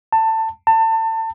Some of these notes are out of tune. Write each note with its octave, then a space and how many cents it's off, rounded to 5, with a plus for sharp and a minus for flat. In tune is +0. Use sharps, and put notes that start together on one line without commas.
A5 +20
A5 +30